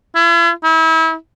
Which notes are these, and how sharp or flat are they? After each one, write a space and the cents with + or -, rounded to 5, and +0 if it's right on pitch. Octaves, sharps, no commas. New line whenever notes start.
E4 +45
E4 -35